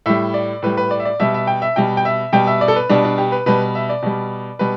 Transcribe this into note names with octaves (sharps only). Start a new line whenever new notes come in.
A2 G3 E5
D5
A2 G3 B4
B4
D5
E5
D5
B2 G3 E5
E5
G5
E5
B2 G3 G5
G5
E5
B2 G3 G5
E5
D5
A4
B4
B2 G3 D4
D4
G4
B4
B2 G3 B4
E5
D5
B2 G3
B2 G3 B4